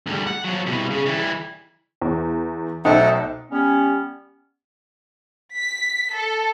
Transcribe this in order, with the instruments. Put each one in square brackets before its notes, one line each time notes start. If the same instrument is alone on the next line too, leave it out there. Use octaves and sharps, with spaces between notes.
[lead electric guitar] D2 G3
F#5
F3 F#3
C2 B2
C#3
E3 G3
[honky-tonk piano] E2
[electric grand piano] B1 C5 G5 [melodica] A3 A4 F#5 [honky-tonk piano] D#4
[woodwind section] G3 B3 C#4
[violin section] B6
A4